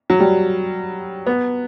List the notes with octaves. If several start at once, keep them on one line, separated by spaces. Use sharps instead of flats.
F#3
G3
B3